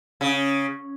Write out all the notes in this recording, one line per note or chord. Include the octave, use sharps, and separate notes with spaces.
C#3